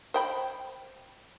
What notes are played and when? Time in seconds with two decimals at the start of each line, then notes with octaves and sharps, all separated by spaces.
0.14 C5 G5 B5